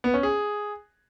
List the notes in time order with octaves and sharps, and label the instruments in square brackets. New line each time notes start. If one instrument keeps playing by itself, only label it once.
[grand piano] B3
C#4
G#4